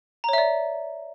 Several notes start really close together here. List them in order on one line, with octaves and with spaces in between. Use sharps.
A#5 C#5 E5 D5